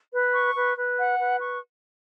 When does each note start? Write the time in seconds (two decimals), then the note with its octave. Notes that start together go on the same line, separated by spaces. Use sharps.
0.12 B4
0.34 C#6
0.55 B4
0.77 B4
0.98 F#5
1.19 B4
1.41 C#6